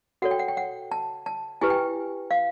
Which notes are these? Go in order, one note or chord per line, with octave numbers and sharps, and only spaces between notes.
F#4 A4 C#5 F#5
G5
F#5
G5
F#5
A5
A5
E4 G4 B4 G#5
G5
F5